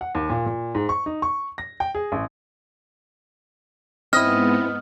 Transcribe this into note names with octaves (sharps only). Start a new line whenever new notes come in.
F#5
D#2
A#2
A#2
G#2
C#6
D#4
C#6
A#6
G5
G#4
A1
G#2 B3 C4 E4 D#5 F6